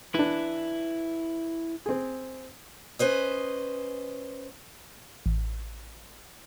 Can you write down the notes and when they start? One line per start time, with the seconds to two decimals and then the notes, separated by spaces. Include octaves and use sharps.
0.14 E3 D4 E4 B4
1.86 C4 G#4
2.99 C#4 B4 C5 D#5
5.26 A1